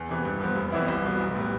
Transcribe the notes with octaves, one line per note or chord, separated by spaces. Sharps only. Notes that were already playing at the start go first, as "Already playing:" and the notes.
Already playing: E2
C3 E3 B3
G2
F3 B3
F1
F2 E3 B3 E4
C2
B2 B3
B1
A2 G3 B3